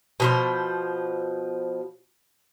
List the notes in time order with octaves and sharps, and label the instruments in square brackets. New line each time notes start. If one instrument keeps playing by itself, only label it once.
[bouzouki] B2 F3 C5